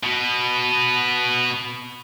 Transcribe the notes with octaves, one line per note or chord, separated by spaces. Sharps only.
B2 B3